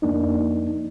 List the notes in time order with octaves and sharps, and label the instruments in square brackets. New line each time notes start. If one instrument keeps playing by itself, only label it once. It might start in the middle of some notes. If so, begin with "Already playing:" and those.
[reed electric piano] F2 A#3 D4 D#4